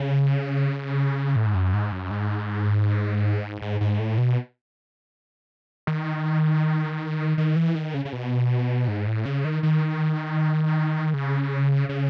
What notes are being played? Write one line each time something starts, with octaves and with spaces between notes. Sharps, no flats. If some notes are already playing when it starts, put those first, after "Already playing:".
Already playing: C#3
A2
G#2
F#2
G#2
F#2
G#2
G#2
G#2
A2
B2
D#3
D#3
E3
D#3
C#3
C#3
B2
G#2
A2
C#3
D#3
D#3
C#3
C#3